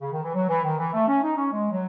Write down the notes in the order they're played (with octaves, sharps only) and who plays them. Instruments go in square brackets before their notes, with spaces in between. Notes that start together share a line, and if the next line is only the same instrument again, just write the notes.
[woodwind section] C#3
D#3
E3
F#3
E3
D#3
E3
A3
C#4
D#4
C#4
G#3
F#3